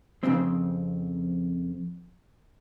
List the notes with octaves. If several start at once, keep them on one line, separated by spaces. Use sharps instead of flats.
F2 G#2 C#3 C4